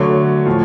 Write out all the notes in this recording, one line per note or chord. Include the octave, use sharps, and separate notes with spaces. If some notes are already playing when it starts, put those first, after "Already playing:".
Already playing: D3 F#3 A3 C#5
A2 F3 A3